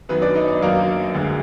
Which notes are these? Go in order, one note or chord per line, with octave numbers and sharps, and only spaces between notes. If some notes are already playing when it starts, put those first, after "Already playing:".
F#2 D#3 F#3 B3 B4
D4 D5
D#4 D#5
D4 D5
F#2 D#3 F#3 A#3 A#4
D2 D3 G#3